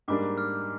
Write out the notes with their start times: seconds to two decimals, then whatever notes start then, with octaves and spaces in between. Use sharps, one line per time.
0.08 G#2 G3 A#3 D4 D6
0.38 F6